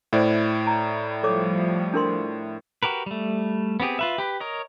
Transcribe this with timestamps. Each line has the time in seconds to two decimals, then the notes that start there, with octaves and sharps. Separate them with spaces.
0.13 A2 E4 C5 D5 F#5
0.67 A#5
1.23 F3 G3 A4 C#5 D6
1.94 D4 A#4 C6
2.83 F#4 G4 A#4 B4
3.06 G3 A3
3.80 B3 C4 G4 G#4
3.99 F4 B4 E5
4.18 G4 B4
4.40 A#4 C#5 D#5